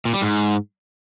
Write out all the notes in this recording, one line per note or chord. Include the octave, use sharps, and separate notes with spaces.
A#2
G3
G#2